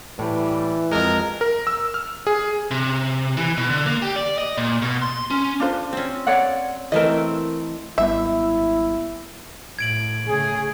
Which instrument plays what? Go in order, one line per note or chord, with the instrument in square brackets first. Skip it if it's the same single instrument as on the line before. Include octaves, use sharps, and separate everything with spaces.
[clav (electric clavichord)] A2 [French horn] E3 [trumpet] G3
[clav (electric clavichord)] F2 G#3 [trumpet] A#4
[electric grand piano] A#4
E6
F6
G#4
[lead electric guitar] C3
E3
B2
D3
A#3
G4
D5
D#5
A#2
B2
C6
C#4
[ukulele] D4 F4 C5
[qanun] C4 C#4
[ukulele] C#5 D5 F#5
[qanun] E3 A3 C4 [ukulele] A#4 D#5
[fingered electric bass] G#1 G3 B3 [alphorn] E4 [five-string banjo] E5
[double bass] A2 [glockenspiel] G#6 D7 F#7
[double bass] C#3 A3 [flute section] G#4